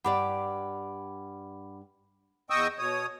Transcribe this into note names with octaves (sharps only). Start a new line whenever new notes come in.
G2 G4 D5 F#5 B5 D6
E2 D#5 G5 C#6 D#6 E6
B2 C#5 D#6